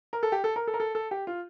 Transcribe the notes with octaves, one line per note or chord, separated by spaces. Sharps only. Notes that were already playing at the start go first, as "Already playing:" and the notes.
A#4
A4
G4
A4
A#4
A4
A#4
A4
A4
G4
F4